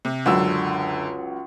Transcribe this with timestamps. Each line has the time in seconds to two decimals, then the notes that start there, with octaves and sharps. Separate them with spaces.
0.05 C3
0.26 C#2 F#2 D3 F#3 E6